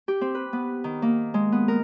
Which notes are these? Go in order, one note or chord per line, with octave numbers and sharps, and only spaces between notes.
G4
C4
B4
B3
D#3
A#3
G#3
B3
A#4